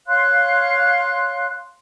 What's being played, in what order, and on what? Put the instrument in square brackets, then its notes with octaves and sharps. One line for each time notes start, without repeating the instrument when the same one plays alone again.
[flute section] C#5 F5 C6 F#6